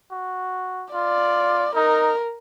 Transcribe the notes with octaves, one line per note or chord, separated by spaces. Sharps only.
F#4
F4 D5
D#4 A#4